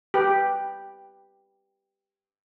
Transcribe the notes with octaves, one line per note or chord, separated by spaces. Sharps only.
G4 B4